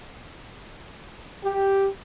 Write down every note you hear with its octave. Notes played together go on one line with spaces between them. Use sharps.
G4